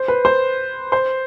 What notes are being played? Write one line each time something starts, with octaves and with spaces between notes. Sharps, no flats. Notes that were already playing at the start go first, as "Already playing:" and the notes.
Already playing: C5
B4
C5
C5